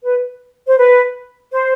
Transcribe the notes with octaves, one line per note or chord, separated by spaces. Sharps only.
B4
C5
B4
C5